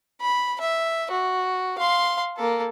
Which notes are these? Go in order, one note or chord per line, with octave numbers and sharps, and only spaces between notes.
B5
E5
F#4
F5 C6
A#3 A4